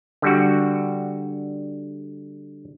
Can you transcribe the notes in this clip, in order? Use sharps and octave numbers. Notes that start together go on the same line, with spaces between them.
D3 G3 F#4